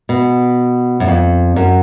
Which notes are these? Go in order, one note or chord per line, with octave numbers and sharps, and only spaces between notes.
B2
F#2
F2
F#2